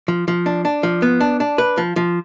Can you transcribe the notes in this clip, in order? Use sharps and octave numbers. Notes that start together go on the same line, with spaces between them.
F3
F3
D4
D4
F3
B3
D4
D4
B4
F3
F3